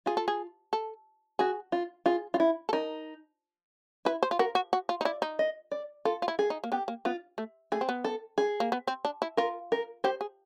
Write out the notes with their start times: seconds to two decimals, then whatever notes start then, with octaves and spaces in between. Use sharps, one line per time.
0.06 F4 G#4
0.17 A4
0.28 G#4
0.73 A4
1.39 F#4 G#4
1.72 F4
2.06 F4 G#4
2.34 F4
2.40 E4
2.69 A4
2.73 D#4 A#4
4.05 E4 B4
4.23 C5
4.31 F4
4.39 F#4 A#4
4.55 F#4
4.73 F#4
4.89 F4
5.01 D#4
5.05 E4 D5
5.22 D#4
5.39 D#5
5.72 D5
6.05 F4 A4
6.22 F4
6.28 E4
6.39 G#4
6.50 D#4
6.64 A#3
6.72 B3 G4
6.88 A#3
7.05 B3 F4
7.38 A3
7.72 A3 G#4
7.81 C4
7.89 B3
8.04 A4
8.38 G#4
8.60 A#3
8.72 B3
8.87 C4
9.05 D4
9.22 E4
9.37 F4 A#4
9.72 A#4
10.04 G4 C5
10.21 G#4